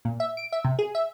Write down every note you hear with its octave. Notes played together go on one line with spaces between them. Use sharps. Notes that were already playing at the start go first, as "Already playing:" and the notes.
A#2
E5
D7
E5
C3
G#4
E5